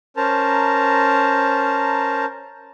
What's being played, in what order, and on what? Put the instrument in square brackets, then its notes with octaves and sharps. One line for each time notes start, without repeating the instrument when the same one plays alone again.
[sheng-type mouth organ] C#4 A#4 C5 A5 A#5